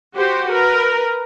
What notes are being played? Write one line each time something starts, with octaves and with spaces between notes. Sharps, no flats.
F#4 G4 C5
A#4 B4